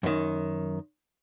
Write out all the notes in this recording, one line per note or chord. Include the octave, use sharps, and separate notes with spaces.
F#2 D#3